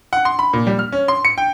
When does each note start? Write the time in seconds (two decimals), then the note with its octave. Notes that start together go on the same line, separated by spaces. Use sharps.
0.13 F#5
0.25 C6
0.39 B5
0.53 A#2
0.67 G3
0.79 F6
0.92 C#4
1.08 C6
1.25 C#7
1.38 G5